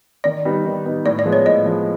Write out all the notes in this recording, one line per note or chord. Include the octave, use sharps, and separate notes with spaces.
D#3 D5
G3 B3 D#4
D#3
G3 B3 D#4
A2 D5
D5
F3 G#3 B3
C#5
A2 D#5
F3 G#3 B3